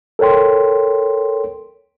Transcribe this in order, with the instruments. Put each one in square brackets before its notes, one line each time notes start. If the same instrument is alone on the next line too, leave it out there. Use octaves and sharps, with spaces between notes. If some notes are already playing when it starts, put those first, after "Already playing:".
[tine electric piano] A4 A#4 C#5 G5 C6